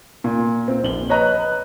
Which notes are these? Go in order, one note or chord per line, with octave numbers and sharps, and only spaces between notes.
A#2
C4
A#1 F#7 G7
B4 C#5 D#5 A#5 F#6
F#6